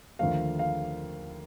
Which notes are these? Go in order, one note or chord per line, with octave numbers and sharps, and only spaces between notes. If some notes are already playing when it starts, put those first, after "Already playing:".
D#2 D3 F3 A3 F5
F5